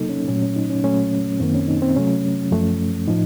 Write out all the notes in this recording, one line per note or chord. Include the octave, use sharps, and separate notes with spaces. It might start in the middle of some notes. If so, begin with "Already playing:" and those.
Already playing: C3 F#3 A#3 D#4 A4
C#4
A#2 F#3 A3 C#4
C#4
D#4
C#4
A#2 F#3 A3 C#4
F#2 D#3 A#3 C4
C#4
D#4
C4
C3 F#3 A3 C#4
F#2 F3 A3
A2 F3 D#4